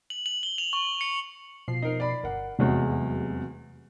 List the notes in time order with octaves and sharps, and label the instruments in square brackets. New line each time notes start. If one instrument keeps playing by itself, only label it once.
[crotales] F#7
F#7
G7
F7
C#6
C#7
[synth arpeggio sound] B2 F3 C7
[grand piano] D#4 A#4
D5 B5
[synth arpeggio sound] G1 [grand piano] A#4 F#5
[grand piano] F1 E2 G#3 [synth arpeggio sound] C3 F#3 F#4